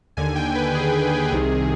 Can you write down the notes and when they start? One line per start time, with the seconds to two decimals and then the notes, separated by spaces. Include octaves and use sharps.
0.17 D#2 D3 G#5
0.36 G5
0.55 B4
0.75 G#4
1.32 C2 C3 D#3